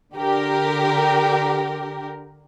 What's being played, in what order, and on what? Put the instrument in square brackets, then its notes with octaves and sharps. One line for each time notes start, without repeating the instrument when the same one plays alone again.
[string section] D3 G4 A#4